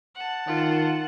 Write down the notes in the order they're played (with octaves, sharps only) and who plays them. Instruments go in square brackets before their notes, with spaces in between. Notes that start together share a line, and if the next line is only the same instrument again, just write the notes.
[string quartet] F#5 A5
[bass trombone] D#3 [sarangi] F4